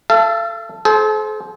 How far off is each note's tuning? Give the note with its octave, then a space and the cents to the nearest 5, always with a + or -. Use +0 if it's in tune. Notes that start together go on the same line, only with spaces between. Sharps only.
A4 +0 F5 -45
A4 -45 C5 +0